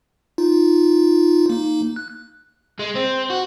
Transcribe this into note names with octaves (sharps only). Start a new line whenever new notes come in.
D#4 F4
A#3 D#4
F#6
G#3
C4
F#4